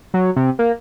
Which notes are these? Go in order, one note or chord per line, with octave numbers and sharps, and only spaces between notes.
F#3
C3
A#3